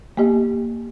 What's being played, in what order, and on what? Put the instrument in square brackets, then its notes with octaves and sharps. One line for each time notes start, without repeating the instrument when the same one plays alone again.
[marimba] A#3 B3 G4 D#5